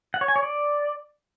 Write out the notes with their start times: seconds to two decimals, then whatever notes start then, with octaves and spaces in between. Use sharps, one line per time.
0.14 F#5
0.21 C#5
0.28 G#5
0.36 C#5
0.43 D5